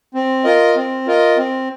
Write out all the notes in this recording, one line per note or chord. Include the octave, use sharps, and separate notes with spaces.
C4
F4 A#4 D#5
C4
F4 A#4 D#5
C4